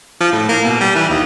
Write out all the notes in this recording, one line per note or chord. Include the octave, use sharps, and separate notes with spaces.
F3
A2
A#3
B2
G3
E3
D#2